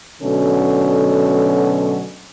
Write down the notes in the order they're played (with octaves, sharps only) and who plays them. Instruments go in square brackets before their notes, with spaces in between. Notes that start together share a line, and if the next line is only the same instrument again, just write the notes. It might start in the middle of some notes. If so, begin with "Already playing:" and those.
[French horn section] B2 D3 F#3 A3 C#4 A4